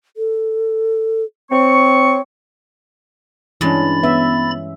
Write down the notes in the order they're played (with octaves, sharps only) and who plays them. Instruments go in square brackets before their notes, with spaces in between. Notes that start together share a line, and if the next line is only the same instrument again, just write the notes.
[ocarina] A4
[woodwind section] C4 C#6 [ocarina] C#5
[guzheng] G2 G#3 [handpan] E3 C#4 [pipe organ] B5 A6
[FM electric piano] B3 [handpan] E5